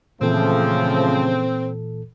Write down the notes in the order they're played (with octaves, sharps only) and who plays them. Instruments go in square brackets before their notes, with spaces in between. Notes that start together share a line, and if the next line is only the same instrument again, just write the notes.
[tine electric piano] A#2 E3 A4 [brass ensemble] C#3 F3 A3 [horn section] C4